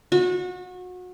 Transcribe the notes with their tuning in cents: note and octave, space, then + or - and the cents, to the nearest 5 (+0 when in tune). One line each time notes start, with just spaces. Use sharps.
F#4 -30